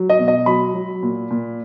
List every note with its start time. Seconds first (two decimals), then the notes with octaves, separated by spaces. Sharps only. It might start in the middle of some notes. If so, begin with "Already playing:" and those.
Already playing: F#3
0.10 D#5
0.19 B2
0.28 D#5
0.46 F#3 B5
0.74 F#3
1.03 A#2
1.30 A#2